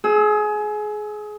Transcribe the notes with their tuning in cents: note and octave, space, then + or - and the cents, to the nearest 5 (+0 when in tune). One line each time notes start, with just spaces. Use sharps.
G#4 +25 E6 -15